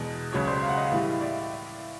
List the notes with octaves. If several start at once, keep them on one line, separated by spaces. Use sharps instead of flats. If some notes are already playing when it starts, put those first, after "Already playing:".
Already playing: E2 B2 G#3
C#2 C#3 F#3 C#5
C5 D5
F5
F#5
D#5 F5
A2 E3 G3
D5 E5